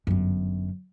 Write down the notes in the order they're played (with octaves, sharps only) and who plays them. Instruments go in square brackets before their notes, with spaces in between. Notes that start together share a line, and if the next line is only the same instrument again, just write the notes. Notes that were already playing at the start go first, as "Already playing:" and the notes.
[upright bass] G1 F#2